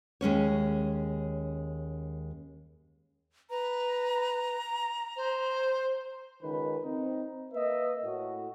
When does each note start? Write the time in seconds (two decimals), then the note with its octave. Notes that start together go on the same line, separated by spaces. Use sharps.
0.21 D#2 G#3 C#4 C#5
3.50 B4 A#5
5.16 C5
6.43 C#2 D#3 B4
6.84 C4 D#4
7.53 A#3 B4 D#5 E5
8.04 A2 F#4